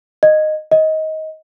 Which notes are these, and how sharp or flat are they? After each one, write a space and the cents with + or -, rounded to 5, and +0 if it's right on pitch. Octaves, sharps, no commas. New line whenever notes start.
D#5 -10
D#5 +20